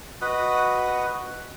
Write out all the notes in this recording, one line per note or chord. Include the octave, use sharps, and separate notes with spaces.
F#4 B4 D#5 F#5